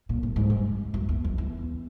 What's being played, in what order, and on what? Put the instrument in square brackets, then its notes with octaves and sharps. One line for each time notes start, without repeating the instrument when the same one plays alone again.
[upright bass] A#2
A2
G#2
G2
F#2
E2
F2
E2